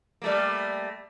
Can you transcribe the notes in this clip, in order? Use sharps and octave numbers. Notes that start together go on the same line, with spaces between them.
G3 A3 A#3